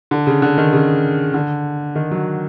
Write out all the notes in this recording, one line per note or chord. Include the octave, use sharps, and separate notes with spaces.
D3
C#3
D3
D#3
C#3
D3
D#3
F#3